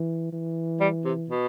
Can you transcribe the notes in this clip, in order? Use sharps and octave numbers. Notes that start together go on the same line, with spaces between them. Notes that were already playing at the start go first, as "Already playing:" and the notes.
Already playing: E3
E3
G3
C3
B2